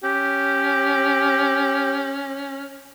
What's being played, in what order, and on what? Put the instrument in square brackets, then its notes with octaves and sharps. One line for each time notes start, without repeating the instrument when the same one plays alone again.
[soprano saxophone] C#4 [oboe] G4